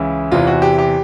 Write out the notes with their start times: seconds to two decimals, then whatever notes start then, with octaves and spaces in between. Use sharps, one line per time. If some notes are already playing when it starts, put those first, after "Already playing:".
Already playing: C#2 C#3 E3 E4
0.31 E2 C3 E3 F4
0.47 F#4
0.62 G4
0.78 G4